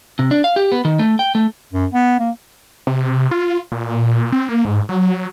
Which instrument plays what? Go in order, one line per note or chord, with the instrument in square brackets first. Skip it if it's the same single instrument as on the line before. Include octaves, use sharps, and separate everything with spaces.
[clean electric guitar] C3
D4
F5
G4
B3
D#3
A3
G5
A3
[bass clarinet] F#2
B3
A#3
[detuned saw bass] C3
F4
A#2
C4
A#3
G#2
F#3